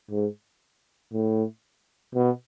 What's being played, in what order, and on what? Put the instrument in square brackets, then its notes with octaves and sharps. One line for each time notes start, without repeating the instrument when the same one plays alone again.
[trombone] G#2
A2
B2